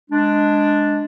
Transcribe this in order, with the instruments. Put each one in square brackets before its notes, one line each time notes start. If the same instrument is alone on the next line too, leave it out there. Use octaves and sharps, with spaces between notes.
[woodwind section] G#3 D4